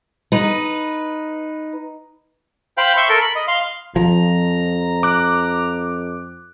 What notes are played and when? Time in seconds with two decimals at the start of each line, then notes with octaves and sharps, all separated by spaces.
0.32 D#4 B4
2.78 C5 F5 G5 B5
2.97 E5 C6 C#6
3.09 A4 A#4
3.21 B5
3.35 D#5
3.48 F5 C6
3.96 F2 F3 A#5
5.03 D6 F#6